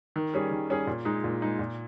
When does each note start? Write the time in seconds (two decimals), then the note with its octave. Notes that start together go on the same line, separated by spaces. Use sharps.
0.16 D#3
0.34 G3 C#4 G#4
0.51 D#3
0.69 G3 C#4 G#4
0.87 A#2
1.05 G#3 D#4
1.24 A#2
1.42 G#3 D#4
1.59 A#2